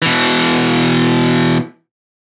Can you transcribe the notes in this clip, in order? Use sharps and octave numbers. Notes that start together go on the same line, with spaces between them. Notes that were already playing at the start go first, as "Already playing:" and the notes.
B2 E3